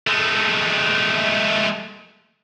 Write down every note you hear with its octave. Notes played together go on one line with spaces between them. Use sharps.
G#3 A3